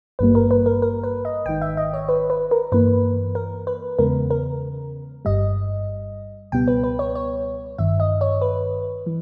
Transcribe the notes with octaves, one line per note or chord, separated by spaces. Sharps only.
G#1 G2 G3 A#3 B4
A#4
B4
A#4
A#4
B4
D#5
G#1 G#2 D#3 G5
E5
D#5
C#5
B4
B4
A#4
G2 E3 A#3 B4
A#4
B4
E2 C#3 G#3 B3 A#4
A#4
G1 G2 G3 D#5
C#2 B2 G3 B3 G5
B4
B4
C#5
C#5
G1 G2 D#3 E5
D#5
C#5
B4
E3